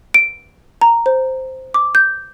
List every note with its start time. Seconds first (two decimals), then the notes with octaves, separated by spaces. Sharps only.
0.14 D7
0.81 A#5
1.06 C5
1.74 D6
1.95 G6